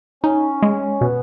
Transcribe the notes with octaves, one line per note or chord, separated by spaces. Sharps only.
C#4 D#4
G#3
B2 B3